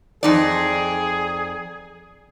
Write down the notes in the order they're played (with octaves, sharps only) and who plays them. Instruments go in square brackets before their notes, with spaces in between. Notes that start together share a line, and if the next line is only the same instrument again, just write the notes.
[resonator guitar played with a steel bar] F2 D#4 D5 [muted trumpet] G#4